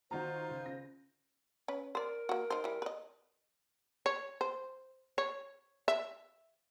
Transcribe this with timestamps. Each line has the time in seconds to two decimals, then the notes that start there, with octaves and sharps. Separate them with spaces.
0.11 D#3 D#4 F4 F#4 C5 A#5
0.49 C#2
0.65 C#3 A#6
1.68 C#4 B4
1.95 A#4 C5 D5
2.29 A#3 F#4
2.50 D#4 C5
2.64 E3 G3
2.82 B4 D#5
4.06 C#5
4.41 C5
5.18 C#5
5.88 E5